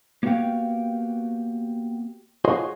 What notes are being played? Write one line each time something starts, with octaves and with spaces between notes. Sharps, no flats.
A#3 B3 F#4 G4 F5 G5
F4 F#4 G#4 C5 C#5 D#5